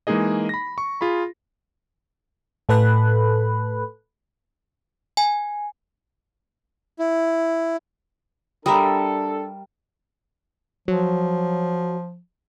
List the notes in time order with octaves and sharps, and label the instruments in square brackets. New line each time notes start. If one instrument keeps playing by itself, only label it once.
[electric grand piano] E3 G#3 A#3 D#4 G#4 D#5
B5 A#6
C#6
F4 G#4 B5
[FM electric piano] A2 A4 B4 B5 F#6
[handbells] G#5
[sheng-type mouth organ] E4
[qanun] G3 A#4 E5 [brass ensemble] D4 A4 [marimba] A#5 B5 D#6
[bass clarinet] F3 [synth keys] F#3